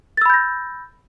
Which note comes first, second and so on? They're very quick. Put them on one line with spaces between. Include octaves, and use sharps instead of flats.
A6 E6 B5 G6 A#6